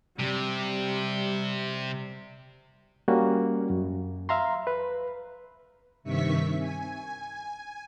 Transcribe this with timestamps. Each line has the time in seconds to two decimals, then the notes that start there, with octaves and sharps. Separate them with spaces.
0.20 C3 G3
3.08 G3 A#3 C#4 F#4
3.70 F#2
4.29 E5 F5 A#5 C6
4.67 B4
6.03 G2 C3 D#3 E5 C#6 B6
6.58 G#5